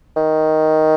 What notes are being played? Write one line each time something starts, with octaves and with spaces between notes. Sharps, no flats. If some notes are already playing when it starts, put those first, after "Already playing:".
D#3